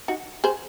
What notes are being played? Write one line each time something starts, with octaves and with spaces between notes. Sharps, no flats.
D#4 F#4
G#4 C5